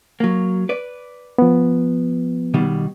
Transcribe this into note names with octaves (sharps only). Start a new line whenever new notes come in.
F#3 A#3
B4 D5
F3 B3
B2 D#3 G3